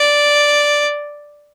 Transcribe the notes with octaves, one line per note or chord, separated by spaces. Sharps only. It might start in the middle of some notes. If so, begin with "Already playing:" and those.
Already playing: D5